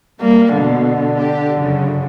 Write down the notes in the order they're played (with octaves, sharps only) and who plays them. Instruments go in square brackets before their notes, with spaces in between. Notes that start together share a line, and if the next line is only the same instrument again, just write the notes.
[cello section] G3 [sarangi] A#3
[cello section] B2 [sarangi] D3
[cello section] G4
F#2 C#3